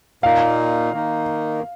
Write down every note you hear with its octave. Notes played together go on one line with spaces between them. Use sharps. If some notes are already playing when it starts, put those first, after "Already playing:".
A#2 A#3 D#4 F5
D#3 A#3 D#4